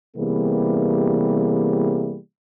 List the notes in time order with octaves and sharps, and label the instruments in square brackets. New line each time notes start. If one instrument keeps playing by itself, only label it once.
[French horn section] C3 E3 G3 A#3 B3 G#4